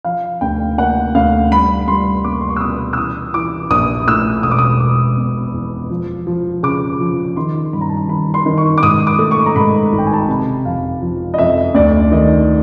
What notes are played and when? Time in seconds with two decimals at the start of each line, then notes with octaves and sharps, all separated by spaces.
0.04 F3 F5
0.41 D2 G5
0.78 A#3 F#5
1.15 D2 F5
1.51 G3 B5
1.88 G3 C6
2.24 A#3 D6
2.33 C#6
2.41 C6
2.49 C#6
2.56 E6
2.61 B2 D#6
2.93 E6
2.97 E3 D#6
3.34 E3 D6
3.71 A#1 D#6
4.07 A2 E6
4.43 E1 D#6
4.51 D6
4.59 D#6
4.80 E1 D6
5.17 B2
5.54 E2
5.90 F3
6.27 F3
6.63 C#3 D6
7.00 F3
7.37 D#3 C6
7.73 G2 B5
7.81 A#5
7.89 A5
7.97 A#5
8.09 D#3 B5
8.34 C6
8.46 D#3
8.58 C#6
8.78 D6
8.82 G#2 D#6
9.07 D6
9.19 A3
9.31 C#6
9.46 A#5
9.55 G#2 B5
9.93 G#1
9.99 G5
10.06 G#5
10.13 A5
10.21 A#5
10.28 C3 B5
10.65 F2 F5
11.02 F3
11.34 D#5
11.38 F2 E5
11.75 D2 D5
12.12 D#3 D#5